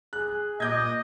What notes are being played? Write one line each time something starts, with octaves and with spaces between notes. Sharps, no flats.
G#4 F#6
A#2 D#5 D6 G6 G#6